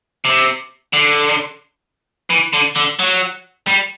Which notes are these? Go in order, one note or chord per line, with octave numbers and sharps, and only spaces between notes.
C3
D3
E3
D3
D3
F#3
G3